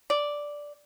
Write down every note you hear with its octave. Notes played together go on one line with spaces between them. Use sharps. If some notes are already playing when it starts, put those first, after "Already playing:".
D5